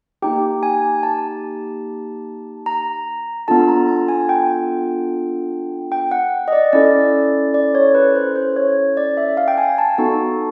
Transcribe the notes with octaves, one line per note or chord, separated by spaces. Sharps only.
A#3 D#4 G4 G5
G#5
A5
A#5
B3 D4 F4 A4 A5
A#5
A5
G#5
G5
G5
F#5
D#5
D5
C#4 E4 A4 D5
D5
C#5
B4
C5
C5
C#5
D5
E5
F5
G5
G#5
A5
B3 D#4 F#4 A4 A5